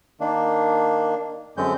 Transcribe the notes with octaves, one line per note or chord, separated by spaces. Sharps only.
D#3 A#3 D4
F#2 D3 G#3 C4 C#4 G6